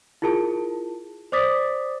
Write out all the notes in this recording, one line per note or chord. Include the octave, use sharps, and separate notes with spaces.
E4 F4 G#4 A#4 A5
C5 D5 D6 D#6 A6 B6